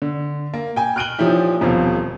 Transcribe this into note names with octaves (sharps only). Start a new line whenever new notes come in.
D3
A#3
G5 G#5
F6 F#6 D7 D#7 F#7 G7
A#2 F3 C#4 D#4 E4 G4
D#1 F2 B2 F3 F5